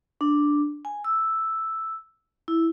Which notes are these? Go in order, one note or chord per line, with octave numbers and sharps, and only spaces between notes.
D4
G#5
E6
E4